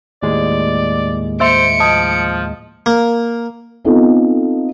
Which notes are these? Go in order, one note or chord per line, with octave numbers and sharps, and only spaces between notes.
D#2 A2 G#3 D5
A#3 C5 E5 C6 C#7 D7
F3 D#5 A5 D#6
A#3
B3 C4 D#4 F4 A4